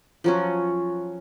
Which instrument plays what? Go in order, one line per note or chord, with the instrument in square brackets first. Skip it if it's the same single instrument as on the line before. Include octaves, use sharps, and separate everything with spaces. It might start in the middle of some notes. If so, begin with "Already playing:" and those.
[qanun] F3 F#3 C#4